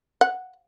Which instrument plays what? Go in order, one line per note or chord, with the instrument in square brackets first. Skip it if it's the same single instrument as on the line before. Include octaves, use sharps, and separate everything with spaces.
[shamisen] F#5